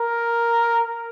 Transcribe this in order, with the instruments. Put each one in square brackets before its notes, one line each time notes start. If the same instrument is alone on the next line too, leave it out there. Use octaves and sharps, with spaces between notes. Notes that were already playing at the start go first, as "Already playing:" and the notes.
Already playing: [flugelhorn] A#4